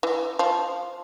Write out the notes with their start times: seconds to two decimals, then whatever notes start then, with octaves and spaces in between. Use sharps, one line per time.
0.03 E3
0.39 F3